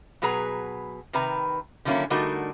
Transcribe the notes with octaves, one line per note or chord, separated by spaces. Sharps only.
B2 F#3 G#4 B4 A#5
C3 D#3 B4 A#5
D3 D#3 F#3 A#3 C#4 E4
D3 G3 A3 D#4 F#4 A#4